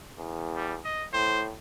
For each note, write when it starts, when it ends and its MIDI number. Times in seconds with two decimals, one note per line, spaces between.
0.19 0.79 40
0.55 0.75 55
0.84 1.06 75
1.13 1.53 45
1.13 1.45 72